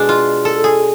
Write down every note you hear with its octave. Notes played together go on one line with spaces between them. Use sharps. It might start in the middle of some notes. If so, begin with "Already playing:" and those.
Already playing: B2 G#3 D4
F4
A4
G#4